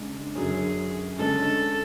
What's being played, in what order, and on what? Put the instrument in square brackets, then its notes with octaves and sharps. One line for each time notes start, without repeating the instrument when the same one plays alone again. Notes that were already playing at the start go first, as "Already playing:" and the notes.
Already playing: [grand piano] C#3 G#3 D4
[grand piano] F#2 D3 F#3 C#4 [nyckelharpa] G#4
[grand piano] D3 G#3 C#4 [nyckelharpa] A4